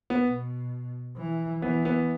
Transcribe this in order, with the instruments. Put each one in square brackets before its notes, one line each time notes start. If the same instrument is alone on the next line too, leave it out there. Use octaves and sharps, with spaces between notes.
[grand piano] B3
[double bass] B2
E3
[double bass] E3 [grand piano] B3
[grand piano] B3